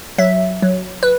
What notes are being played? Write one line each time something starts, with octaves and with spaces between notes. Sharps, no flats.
F#3 E5
F#3
B4